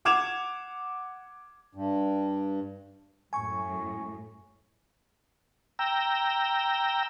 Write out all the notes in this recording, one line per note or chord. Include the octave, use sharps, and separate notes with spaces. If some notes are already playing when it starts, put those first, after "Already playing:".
F#5 D6 G#6 E7 F7
G2
F#2 A2 G#5 C#6
G5 A#5 E6